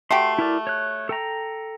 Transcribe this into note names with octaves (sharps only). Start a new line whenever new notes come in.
A3 F#4 G4 C6
E4 A#4 D5
C#5 F#6
A4 G5 A#5